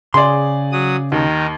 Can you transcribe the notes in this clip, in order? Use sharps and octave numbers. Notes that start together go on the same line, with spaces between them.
C#3 G#4 D5 C6
F#3 D#6
D#2 D#3 D#4